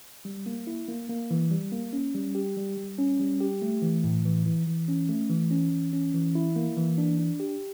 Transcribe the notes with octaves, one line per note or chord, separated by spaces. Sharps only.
G3
A#3
E4
A#3
A#3
E3
G3
A#3
C#4
G3
G4
G3
G3
C#4
G3
G4
A3
E3
A2
E3
E3
E3
C#4
A3
E3
C#4
E3
C#4
E3
E4
A#3
E3
D4
D4
G4